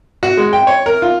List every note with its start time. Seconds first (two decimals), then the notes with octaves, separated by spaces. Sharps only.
0.23 F#4
0.37 G#3
0.53 G5
0.67 C#5
0.86 A#4
1.02 F4